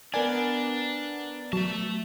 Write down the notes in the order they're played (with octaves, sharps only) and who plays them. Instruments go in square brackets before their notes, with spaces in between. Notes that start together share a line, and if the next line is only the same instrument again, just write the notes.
[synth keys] B3 A#4 D5 [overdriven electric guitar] D4 [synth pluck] G#5
[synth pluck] F#3 [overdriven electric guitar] A3 A5